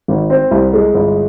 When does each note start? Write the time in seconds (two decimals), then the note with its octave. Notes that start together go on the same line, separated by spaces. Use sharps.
0.08 G#1
0.30 C4
0.51 C2
0.73 G#3
0.94 G1